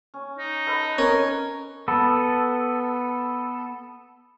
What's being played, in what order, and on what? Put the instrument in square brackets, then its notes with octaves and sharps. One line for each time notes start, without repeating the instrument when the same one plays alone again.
[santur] C#4
[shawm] D#4
[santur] A4 B4 D#5
[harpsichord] C#4 [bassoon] A#4 [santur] B4
[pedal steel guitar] B3 A4